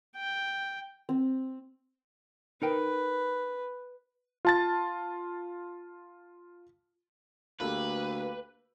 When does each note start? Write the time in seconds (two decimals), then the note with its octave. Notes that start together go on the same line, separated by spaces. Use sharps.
0.16 G5
1.09 C4
2.62 D#4 A#4 B4 G5
4.45 F4 A5 A6
7.61 D2 A#3 G4 A4 B4